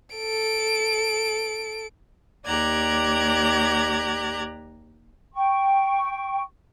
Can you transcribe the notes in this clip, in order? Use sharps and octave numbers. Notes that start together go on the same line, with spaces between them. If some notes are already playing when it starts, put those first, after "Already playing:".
A4 D7
D#2 G4 D5 A#5 F#6 G#6
G5 C#6